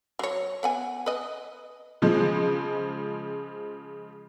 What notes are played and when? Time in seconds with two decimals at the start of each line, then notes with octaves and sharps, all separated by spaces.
0.19 F#3 C#5
0.63 B3 F#5 G#5
1.06 B4 D#5
2.02 C#3 F3 G#3